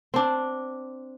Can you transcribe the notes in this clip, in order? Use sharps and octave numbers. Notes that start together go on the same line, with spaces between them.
C4 D4